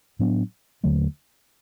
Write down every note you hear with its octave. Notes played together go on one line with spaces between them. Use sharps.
A2 F#3 B3 D4
D#2 D3 F#3 A3